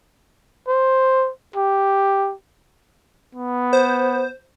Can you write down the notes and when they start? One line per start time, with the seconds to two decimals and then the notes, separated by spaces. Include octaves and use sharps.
0.68 C5
1.56 G4
3.35 B3
3.73 C5